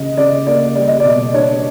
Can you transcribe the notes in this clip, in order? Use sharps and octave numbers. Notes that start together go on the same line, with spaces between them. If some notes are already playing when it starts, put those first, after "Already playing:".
Already playing: C#3 D#5
C#3 D5
A#3 D5
G3 D5
D#5
B2 D5
D4 C#5